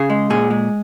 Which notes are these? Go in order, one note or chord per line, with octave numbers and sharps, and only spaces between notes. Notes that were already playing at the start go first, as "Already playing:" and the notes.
Already playing: C#3 G#4
G#3
A#2 G#4
G#3